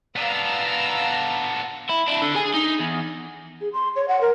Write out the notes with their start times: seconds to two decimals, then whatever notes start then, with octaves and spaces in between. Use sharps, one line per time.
0.16 B3 D4 F5 A#5 E6
1.89 E4
2.08 D4 E4
2.22 D3
2.35 G#4 G#5
2.54 D#4
2.80 E2
3.61 G#4
3.73 C6
3.96 C#5
4.08 F#5
4.21 A#4